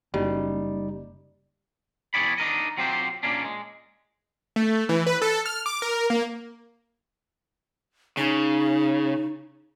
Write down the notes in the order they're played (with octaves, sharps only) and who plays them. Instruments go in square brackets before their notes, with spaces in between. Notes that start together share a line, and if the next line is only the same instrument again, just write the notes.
[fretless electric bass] F#1 [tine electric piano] G3 D#4
[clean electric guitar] E2 A#2 G#4 C#5 D5 B5
D4 D#4 A#4 D#5
F#3 C4 F4 G4 C5
A#2 A#3 C#4 D4
G#3
[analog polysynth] A3
E3
B4
A4
F6
D6
A#4
A#3
[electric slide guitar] C#3 [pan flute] D#4